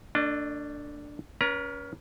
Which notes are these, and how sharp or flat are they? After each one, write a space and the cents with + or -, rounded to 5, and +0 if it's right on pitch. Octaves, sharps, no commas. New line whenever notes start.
A3 +35 D4 +0 D#5 -40
C#4 +25 B4 -40 A#5 +20